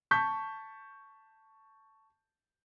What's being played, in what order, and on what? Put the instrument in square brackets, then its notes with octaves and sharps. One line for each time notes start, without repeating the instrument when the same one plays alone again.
[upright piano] A5 C#6 G6 B6